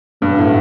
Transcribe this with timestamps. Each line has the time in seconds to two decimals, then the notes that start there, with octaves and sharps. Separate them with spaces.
0.22 G2 B2 F#3 B3 F#4
0.38 A2